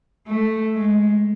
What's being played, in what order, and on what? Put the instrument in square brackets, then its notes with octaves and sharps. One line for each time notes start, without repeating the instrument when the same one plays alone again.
[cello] A3
G#3